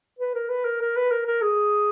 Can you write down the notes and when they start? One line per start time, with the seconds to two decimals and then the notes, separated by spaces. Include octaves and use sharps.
0.19 B4
0.34 A#4
0.49 B4
0.64 A#4
0.80 A#4
0.96 B4
1.11 A#4
1.26 A#4
1.42 G#4